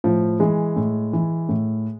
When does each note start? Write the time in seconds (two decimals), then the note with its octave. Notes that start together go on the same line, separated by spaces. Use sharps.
0.04 A2 F3
0.40 E3 G#3
0.76 A2
1.13 E3
1.49 A2